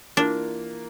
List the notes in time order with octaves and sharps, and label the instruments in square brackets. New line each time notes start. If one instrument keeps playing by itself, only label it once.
[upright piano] E3 A#3 F4 A#4 [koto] D4